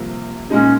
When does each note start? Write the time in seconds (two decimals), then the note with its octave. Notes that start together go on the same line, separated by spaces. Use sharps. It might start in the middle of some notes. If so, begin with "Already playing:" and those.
Already playing: C2 C3 F3 A#3
0.50 A#2 G#3 C#4 D#4 G#4